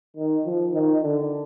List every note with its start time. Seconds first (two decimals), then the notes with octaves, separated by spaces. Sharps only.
0.17 D#3
0.45 F3
0.73 D#3
1.02 D3